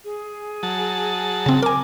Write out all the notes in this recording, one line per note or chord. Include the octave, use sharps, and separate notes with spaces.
G#4
F#3 A5
C#3 C4
A#4 G#5 D6